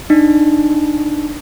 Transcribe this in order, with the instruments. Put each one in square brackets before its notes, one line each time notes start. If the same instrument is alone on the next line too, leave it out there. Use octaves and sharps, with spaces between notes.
[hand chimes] D4 D#4